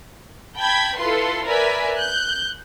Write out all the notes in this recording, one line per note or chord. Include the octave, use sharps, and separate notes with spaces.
G5 A5 B5 G#6
E4 F4 A4 B4 C6
A#4 B4 D5 E5 G#5 B5
F#6 G6